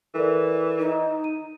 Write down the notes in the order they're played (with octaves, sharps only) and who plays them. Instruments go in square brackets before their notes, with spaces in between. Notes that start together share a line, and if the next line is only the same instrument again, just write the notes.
[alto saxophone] E3 [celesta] A4 A#4 D5
[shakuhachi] D#4
[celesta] D#7